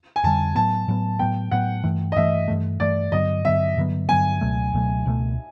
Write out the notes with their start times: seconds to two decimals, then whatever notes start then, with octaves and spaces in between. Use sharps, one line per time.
0.16 G#5
0.24 F2 D3 G3 A5
0.55 A2 F#3 B3 A5
0.88 A2 F#3 B3
1.19 A2 F#3 B3 G5
1.51 A2 F#3 B3 F#5
1.84 G2 E3 A3
2.12 D#5
2.16 G2 E3 A3 E5
2.48 G2 E3 A3
2.80 G2 E3 A3 D5
3.12 G2 D3 F#3 B3 D#5
3.45 G2 D3 F#3 B3 E5
3.77 G2 D3 F#3 B3
4.08 G2 D3 F#3 B3 G#5
4.41 C#2 B2 F#3 A3
4.73 C#2 B2 F#3 A3
5.06 C#2 B2 F#3 A3